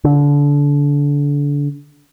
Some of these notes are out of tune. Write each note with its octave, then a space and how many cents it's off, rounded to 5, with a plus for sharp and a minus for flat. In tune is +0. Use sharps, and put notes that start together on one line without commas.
D3 -30